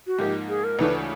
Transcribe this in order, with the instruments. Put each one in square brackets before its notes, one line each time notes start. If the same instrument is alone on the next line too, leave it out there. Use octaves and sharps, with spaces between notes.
[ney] F#4
[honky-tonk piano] G#2 F3 A#3 D#4 [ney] G4
[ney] G#4
A#4
[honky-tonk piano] D2 C#3 E3 A3 D4 [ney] B4